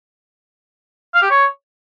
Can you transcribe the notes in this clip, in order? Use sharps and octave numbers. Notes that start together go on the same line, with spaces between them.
F5
G4
C#5